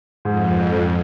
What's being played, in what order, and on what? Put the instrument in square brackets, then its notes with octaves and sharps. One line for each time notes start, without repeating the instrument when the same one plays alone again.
[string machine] F2 [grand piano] G#2